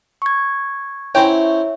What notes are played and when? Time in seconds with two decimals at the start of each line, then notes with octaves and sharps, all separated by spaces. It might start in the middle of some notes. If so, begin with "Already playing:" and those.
0.22 C#6 G#6
1.15 F#3 C#4 E4 C5 C#5 E5 G5